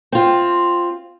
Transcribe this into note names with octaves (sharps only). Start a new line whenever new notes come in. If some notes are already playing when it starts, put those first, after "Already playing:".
C4 F4